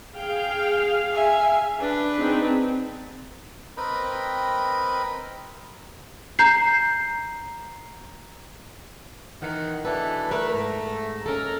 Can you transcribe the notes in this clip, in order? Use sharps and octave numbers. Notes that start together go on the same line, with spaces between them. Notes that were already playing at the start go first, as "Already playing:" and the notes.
G#4 F5 G5
E5 G#5
D4 B4
C4 D#4 G#4
C4 A#4 B4 D#5 G5 B5
A#5 G6 C7
D#3 E3 F#5
B2 E3 D4 E4 A4 B4
A3 A#4 B4 B5
G#2 A#5
A#3 C#4 D#4 A4 A#4